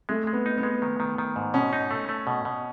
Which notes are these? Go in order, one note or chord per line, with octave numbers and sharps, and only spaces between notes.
G#3 A3
G#3
B3
D#4
B3
G#3
D#3
D#3
D#3
G#2
B2 C#4
D#4
A3
A3
B2
B2